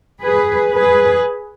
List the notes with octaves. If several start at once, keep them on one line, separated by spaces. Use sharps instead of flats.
G#4 B4
G#4 B4